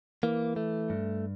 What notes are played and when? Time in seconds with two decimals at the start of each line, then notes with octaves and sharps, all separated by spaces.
0.23 E3 A#3
0.56 A3
0.90 G2